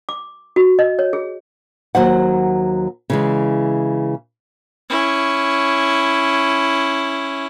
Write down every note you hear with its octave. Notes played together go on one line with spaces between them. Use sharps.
D6
F#4
D#5
C#5
G#4
D#2 F#3 C5 F#5
C#3 E3 G#3
C#4 E4